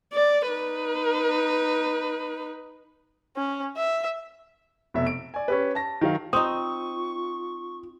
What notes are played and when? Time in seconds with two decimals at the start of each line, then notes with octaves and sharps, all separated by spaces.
0.13 D5
0.50 D#4 B4
3.36 C#4
3.77 E5
4.94 F1 B2 E5
5.07 D7
5.34 D5 G#5
5.48 C#4 G4 B4
5.75 A5 A#6
6.01 D#3 F#3 F5
6.33 C4 D#4 F4 C#6 D#6